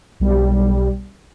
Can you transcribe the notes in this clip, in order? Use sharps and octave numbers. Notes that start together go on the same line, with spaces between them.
B1 G3